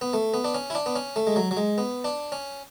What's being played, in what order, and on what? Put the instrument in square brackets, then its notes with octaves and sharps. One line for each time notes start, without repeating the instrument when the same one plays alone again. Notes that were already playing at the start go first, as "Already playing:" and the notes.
[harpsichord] B3
A3
B3
D4
C#4
E4
D4
B3
C#4
A3
G#3
F#3
F#3
G#3
B3
D4
C#4